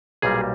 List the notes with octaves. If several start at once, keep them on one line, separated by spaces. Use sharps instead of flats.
B1 A#2 G3 A#3 G#4